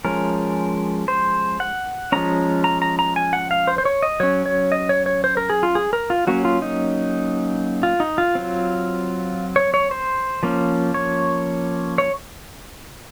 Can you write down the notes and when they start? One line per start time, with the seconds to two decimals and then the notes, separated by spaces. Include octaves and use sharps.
0.05 F3 G#3 C#4 A#4
1.08 C5
1.60 F#5
2.12 F3 G#3 C#4 A#5
2.64 A#5
2.82 A#5
2.99 A#5
3.16 G#5
3.33 F#5
3.51 F5
3.67 C5
3.78 C5
3.85 C#5
4.03 D#5
4.20 F#3 C#4 C#5
4.46 C#5
4.72 D#5
4.89 C#5
5.06 C#5
5.24 C5
5.37 A#4
5.50 G#4
5.63 F4
5.75 G#4
5.93 A#4
6.10 F4
6.27 F#3 A#3 C#4 F#4
6.45 F4
6.62 D#4
7.83 F4
8.00 D#4
8.18 F4
8.35 F#3 C4
9.56 C#5
9.74 C#5
9.91 C5
10.43 F3 A#3 C#4
10.94 C#5
11.98 C#5